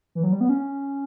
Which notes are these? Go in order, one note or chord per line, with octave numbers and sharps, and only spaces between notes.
E3
F#3
G3
B3
C#4